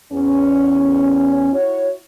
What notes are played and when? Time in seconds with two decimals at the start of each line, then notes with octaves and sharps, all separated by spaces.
0.12 E2 C#4
1.52 E4 F#4 C#5